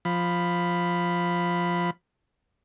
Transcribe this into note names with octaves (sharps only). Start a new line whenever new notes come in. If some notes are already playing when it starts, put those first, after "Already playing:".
F3 B5